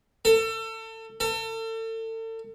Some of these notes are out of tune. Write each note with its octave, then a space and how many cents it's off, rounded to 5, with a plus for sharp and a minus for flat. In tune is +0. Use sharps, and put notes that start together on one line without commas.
A4 +30
A4 +35